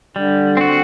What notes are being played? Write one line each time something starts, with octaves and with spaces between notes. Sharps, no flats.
D3 G3
C4 F#4